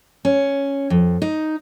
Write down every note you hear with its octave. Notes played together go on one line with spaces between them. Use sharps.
C#4
F2
D#4